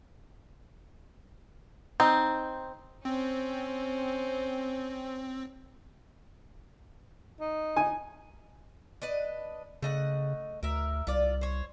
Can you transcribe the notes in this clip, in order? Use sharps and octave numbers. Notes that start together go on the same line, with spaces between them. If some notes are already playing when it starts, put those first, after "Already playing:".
C4 D#4
C4 C#4 C5
D#4
G#5
D4 B4 D#5
C#3 A3 D#5 F#5
D2 A#4 E5
C2 F4 D5
C5 C#5